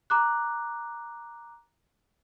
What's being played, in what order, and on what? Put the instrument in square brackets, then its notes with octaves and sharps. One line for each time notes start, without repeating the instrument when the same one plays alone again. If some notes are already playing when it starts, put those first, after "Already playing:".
[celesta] A#5 D6 F#6